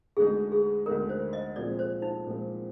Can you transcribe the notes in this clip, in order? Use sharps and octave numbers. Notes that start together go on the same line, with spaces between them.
D2 D3 G#3 D#4 G#4
G#4
D2 D3 G#3 D#4 A#4
C5
D#5
C2 A#2 F3 G#3 C4 D5
C5
D#4
C2 A#2 F3 G#3 C4